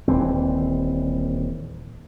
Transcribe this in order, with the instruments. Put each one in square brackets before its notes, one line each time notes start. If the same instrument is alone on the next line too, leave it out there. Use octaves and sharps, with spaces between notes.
[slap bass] D#1 E3 C4